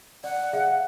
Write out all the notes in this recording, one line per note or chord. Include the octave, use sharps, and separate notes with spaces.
D5 F#5
G#4 E5 F5